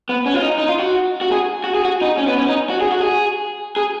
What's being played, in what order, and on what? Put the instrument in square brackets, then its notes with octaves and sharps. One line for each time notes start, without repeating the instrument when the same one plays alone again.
[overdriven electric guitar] B3
C#4
F4
D#4
D#4
F4
F#4
F#4
G#4
F#4
G#4
F#4
D#4
C#4
B3
C#4
D#4
F#4
G#4
F#4
G#4
G#4